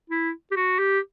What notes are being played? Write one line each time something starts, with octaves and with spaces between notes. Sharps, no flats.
E4
G4
F#4
G4